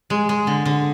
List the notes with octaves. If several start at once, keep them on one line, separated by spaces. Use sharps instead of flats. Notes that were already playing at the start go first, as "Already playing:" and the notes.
G#3
G#3
D3
D3